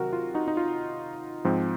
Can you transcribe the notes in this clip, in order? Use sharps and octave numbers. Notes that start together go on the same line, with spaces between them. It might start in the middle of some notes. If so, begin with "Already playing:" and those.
Already playing: C3 D#3 F#3 F#4 A#4
F4
D#4 F#4
D#4
F4
G#2 F3 C4